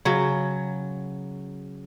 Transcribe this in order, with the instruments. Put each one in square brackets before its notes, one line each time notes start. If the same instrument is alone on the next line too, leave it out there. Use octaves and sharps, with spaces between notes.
[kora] C#3 F#3